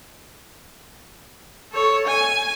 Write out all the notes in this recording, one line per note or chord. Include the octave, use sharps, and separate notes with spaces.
A4 C#5
G#5